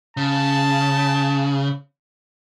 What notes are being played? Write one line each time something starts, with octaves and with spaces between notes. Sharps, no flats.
C#3 A5